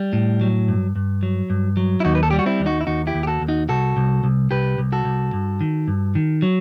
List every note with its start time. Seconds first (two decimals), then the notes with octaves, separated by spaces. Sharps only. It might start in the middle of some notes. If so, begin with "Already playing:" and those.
Already playing: G3
0.13 A2
0.41 F#3
0.68 G2
0.96 G2
1.23 F#3
1.50 G2
1.77 F#3
2.00 E4
2.05 D#2 D#4 F#4
2.15 B4
2.23 A4
2.31 G3 G4
2.39 F#4
2.46 C4 E4
2.60 D#2
2.66 D#4 F#4
2.81 E4
2.87 D#2 D#4 F#4
3.07 E4 G4
3.14 D#2
3.23 G4
3.27 F#4 A4
3.41 D#2
3.48 D#4 F#4
3.69 C2 F#4 A4
3.97 C2
4.24 C2
4.51 C2 G4 B4
4.78 C2
4.92 F#4 A4
5.05 C2
5.33 G2
5.61 D#3
5.88 G2
6.15 D#3
6.42 F#3